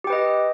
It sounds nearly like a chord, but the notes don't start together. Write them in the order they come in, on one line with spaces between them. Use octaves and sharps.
G4 G5 B4 D#5